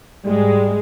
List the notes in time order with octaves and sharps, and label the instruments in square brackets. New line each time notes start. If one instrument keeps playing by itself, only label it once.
[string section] G#2 G#3 [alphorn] G3